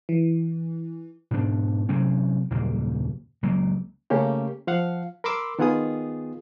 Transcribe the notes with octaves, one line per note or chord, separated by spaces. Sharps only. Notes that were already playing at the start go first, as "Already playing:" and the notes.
E3
G#2 B2 D4
C3 F#3 C4 C#4
F#1 D#2 A#2 A#3
C#2 F#3 A#3
C#3 A3 A#3 C#4 G4
F3 F5 F#5
A#4 B5 C6 D6 E6
D#3 B3 F4 G#4 D#6